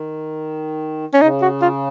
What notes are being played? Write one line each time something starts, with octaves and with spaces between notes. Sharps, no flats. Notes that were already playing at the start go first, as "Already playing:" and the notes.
Already playing: D#3
C#4
C#3 D#4
F#4
F4